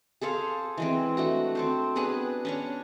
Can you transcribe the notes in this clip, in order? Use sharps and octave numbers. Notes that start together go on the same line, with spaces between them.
G#4 A4 C5 F5
E3 G#3 C4
A3 D4 F#4
C4 A4 C5
B3 D4 G#4 B4
C#4 D4 C#5